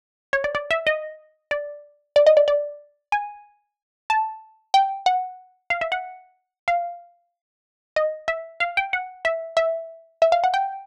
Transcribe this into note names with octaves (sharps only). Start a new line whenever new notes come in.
C#5
D5
D5
E5
D#5
D5
D5
D#5
D5
D5
G#5
A5
G5
F#5
F5
E5
F#5
F5
D#5
E5
F5
G5
F#5
E5
E5
E5
F5
F#5
G5